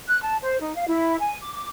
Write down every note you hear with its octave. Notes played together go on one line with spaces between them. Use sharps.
F#6
A5
C5
D#4
F5
E4
G#5
D6
D6